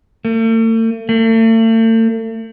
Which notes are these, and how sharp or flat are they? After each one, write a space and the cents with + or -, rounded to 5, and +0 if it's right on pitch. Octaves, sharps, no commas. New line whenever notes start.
A3 +45
A3 +40